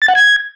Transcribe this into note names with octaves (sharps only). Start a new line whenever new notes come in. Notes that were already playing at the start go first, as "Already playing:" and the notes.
A6
F#5
G#6